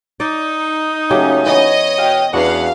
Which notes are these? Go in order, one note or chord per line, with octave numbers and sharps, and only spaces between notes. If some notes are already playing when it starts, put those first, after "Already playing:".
D#4 D5
C#3 F#3 A3 A#3 C#4 G4
E3 B3 C#5 D#5
B2 F5 G5
E2 B3 C#4 D4 F#4 B4 F5 F#5